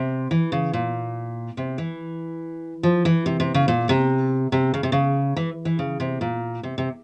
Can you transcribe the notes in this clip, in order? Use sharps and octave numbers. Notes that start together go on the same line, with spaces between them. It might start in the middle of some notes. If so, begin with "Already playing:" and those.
Already playing: C3
E3
C#3
A#2
C3
E3
F3
E3
C3
C3
C#3
A#2
C3
C3
C#3
C3
C#3
E3
E3
C#3
C3
A#2
C3
C3